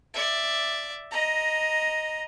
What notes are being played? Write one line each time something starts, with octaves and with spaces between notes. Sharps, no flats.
D5 E5
D#5 A#5